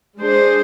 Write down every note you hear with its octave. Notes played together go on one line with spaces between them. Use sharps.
G#3 D4 G#4 C5